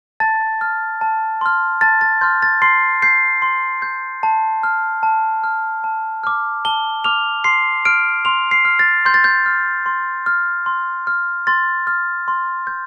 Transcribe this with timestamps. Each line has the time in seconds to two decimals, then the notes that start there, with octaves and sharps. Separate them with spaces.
0.20 A5 A6
0.61 F6
1.01 A5
1.41 C6 F6
1.81 A5 A6
2.01 A6
2.21 C6 F6 G6
2.42 A6
2.62 C6 C7
3.02 G6 C7
3.42 C6
3.82 G6
4.23 A5
4.63 F6
5.03 A5
5.44 F6
5.84 A5
6.24 D6 F6
6.65 A5 G7
7.04 D6 F6 F7
7.44 C6 C7
7.85 F6 D7
8.25 C6 F7
8.51 C7
8.65 F6
8.79 A6
9.05 C6 G6
9.14 A6
9.24 G6
9.46 F6
9.86 C6
10.26 F6
10.66 C6
11.07 F6
11.47 C6 A6
11.87 F6
12.28 C6
12.67 G6